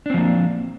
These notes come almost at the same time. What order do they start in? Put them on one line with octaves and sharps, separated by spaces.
D4 C4 F3 A#3